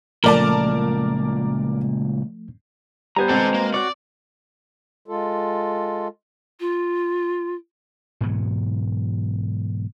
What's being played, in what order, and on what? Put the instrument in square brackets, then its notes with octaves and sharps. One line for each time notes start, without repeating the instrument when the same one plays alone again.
[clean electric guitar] C#2 A#2 [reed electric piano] F3 A3 [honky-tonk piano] A#4 D5 A5
[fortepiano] G3 B3 [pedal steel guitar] C5 G#5 A#5
[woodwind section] B2 G#3 [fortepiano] C4 [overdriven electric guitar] A4 F#5
[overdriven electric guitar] A#3
[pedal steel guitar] F#4 C#5 [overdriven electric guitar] D5
[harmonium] G#3 F4 A4
[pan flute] F4
[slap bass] G#2 B2 E3 F#3